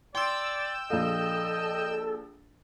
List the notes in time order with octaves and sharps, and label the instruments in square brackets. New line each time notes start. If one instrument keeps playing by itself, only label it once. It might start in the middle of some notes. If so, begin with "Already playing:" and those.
[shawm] D5 [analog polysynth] G5 E6 [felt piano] C6
[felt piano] A#1 F5 [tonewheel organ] A4 [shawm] D#5